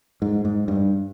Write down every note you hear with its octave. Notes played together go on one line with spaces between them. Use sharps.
G#2
G#2
G2